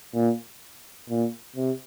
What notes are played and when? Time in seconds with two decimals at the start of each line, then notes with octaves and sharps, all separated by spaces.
0.15 A#2
1.10 A#2
1.56 C3